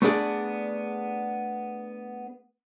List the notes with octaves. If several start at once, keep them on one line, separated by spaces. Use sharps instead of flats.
A3 B3 D4 G#4 D5